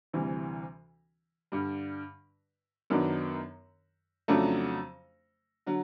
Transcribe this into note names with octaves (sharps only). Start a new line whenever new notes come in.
D2 C3 E3 G3
G2 D3 G3
F#2 D#3 F#3 B3 D4
F2 C#3 F#3 A3 D4
D3 F#3